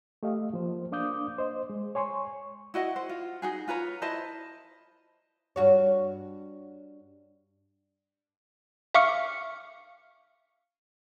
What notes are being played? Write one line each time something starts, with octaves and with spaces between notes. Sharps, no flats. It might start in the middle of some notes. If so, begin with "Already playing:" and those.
A3 G4 D#5 F5
F3 A#3 C5
A#3 D4 F5 D6 D#6 G6
C5 D#5
G#3
C#5 G#5 C6 C#6
E4 F#4 D#5 F#5
C5
F4
D#4 F#4 G#4
F4 B4 C#5 A#5
E4 C5 D#5 A5
G2 F#4 C#5
E5 F5 C#6 D6 F6 C#7